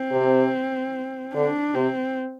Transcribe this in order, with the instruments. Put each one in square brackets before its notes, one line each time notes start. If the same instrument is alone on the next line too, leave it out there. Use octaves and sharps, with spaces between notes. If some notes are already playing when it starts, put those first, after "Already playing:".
Already playing: [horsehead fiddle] C4
[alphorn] C3
[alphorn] D3 [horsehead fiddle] D4
[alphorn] C3 [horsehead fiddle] C4